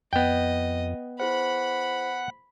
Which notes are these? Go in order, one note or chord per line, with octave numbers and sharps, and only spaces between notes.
F2 B3 D#5 G5
E4 G#4 C5 F#5 B5